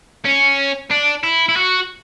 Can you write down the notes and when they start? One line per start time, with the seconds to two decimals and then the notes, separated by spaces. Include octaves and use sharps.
0.25 C#4
0.91 D4
1.23 E4
1.49 E4
1.56 F#4